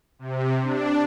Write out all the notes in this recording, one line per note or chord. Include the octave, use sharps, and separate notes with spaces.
C3
D4